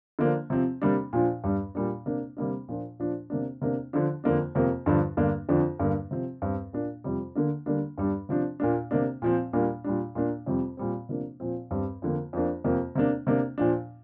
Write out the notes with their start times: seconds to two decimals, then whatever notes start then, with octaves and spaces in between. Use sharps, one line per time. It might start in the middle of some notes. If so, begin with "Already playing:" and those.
0.19 D3 F3 A#3 D4
0.50 C3 F3 C4
0.82 C3 G3 A#3 D4
1.13 A#2 F3 D4
1.44 G2 G3 D4
1.75 A#2 G3 A#3 D4
2.06 C3 A#3 D4
2.37 C3 G3 A#3 D4
2.68 A#2 F3 A#3 D4
2.99 A#2 F3 D4
3.30 C3 A#3 D4
3.62 C3 A#3 D4
3.93 D3 F3 D4
4.24 F2 D3 A#3 D4
4.55 F2 C3 A#3
4.86 G2 D3 F3 D4
5.17 G2 D3 A#3 D4
5.49 F2 D3 F3 D4
5.79 G2 D3 A#3 D4
6.11 C3 F3 C4
6.42 G2 G3 C4
6.73 A#2 A#3 D4
7.04 F2 C3 G3
7.35 D3 A#3 D4
7.66 D3 G3 A#3 D4
7.97 G2 G3 D4
8.29 C3 F3 D4
8.60 A#2 A#3 D4
8.91 C3 A#3 D4
9.22 A#2 F3 C4
9.53 A#2 G3 A#3 D4
9.84 A#2 G3 D4
10.15 A#2 A#3 D4
10.46 F2 C3 G3 C4
10.77 A#2 G3 C4
11.09 C3 F3 A#3 D4
11.40 A#2 F3 C4
11.71 G2 G3 C4
12.02 F2 D3 A#3
12.33 F2 F3 A#3 D4
12.64 F2 C3 A#3
12.95 C3 A#3 D4
13.27 C3 A#3 D4
13.58 A#2 F3 D4